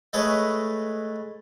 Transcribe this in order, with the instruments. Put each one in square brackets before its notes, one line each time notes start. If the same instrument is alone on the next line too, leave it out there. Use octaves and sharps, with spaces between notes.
[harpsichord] G#3 A3 A4 B4 C#5 D#5